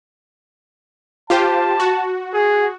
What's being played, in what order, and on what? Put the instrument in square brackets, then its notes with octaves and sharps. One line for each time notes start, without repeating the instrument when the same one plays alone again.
[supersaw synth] F4 G4 C5 [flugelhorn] A5
[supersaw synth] F#4
[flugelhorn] G#4